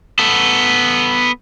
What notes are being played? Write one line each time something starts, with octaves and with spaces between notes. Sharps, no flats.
B3 A4